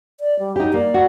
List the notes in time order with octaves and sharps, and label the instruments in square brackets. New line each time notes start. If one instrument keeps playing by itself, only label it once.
[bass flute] D5
G3
[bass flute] F#3 [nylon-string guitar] D#4 G4
[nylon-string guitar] A#3 [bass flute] D5
[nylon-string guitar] F#4